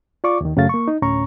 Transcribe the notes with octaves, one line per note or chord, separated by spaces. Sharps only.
F4 D5 C#6 D6
D#2 D#3
F#2 C#3 F#3 A3 F5 A6
A#3 C#6
D#4
D2 A2 C#4 A#5 C#6